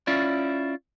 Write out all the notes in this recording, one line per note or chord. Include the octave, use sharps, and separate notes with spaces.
C#4 E4 F4 D5